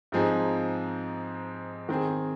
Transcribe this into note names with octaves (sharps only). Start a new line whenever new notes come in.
G#2 F3 C4 D#4 G#4
D#3 C4 G#4